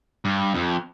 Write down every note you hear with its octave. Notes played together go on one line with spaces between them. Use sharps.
G2
F2